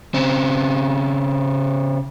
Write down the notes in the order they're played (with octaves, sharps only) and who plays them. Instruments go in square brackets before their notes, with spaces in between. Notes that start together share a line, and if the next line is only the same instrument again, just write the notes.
[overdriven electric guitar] C#3 C4